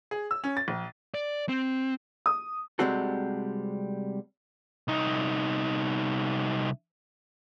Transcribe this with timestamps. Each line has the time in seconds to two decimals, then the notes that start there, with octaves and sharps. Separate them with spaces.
0.11 G#4
0.31 E6
0.44 C#4
0.57 A6
0.68 A#1
1.14 D5
1.49 C4
2.26 D#6
2.79 C3 G3 G#3 C4 F#4 A4
4.88 C2 D#4